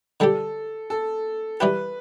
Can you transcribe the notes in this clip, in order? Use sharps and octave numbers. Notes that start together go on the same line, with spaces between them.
D3 G3 D4 G4 A4
A4
E3 G3 E4 G4 B4